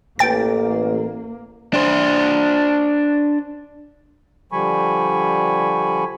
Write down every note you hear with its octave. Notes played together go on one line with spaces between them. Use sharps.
A1 A#3 G5 A6
D4 C5
D3 F3 G3 G#5 B5 C#6